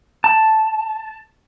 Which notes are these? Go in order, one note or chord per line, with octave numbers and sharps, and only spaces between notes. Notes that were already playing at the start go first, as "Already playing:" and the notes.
A5